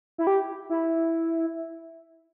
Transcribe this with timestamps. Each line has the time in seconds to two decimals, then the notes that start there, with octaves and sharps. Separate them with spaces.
0.18 E4
0.27 G4
0.70 E4